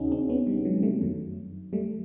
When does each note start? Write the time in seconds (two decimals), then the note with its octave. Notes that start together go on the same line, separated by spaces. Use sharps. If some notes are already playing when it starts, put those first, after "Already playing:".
Already playing: D2 C3 D#3 C#4 D#4 F#4 G#4
0.11 C4 D4
0.29 B3 C#4
0.47 G3
0.65 F#3 G#3
0.83 G3 A3
1.01 F#2 D#3 F#3
1.73 G3 A3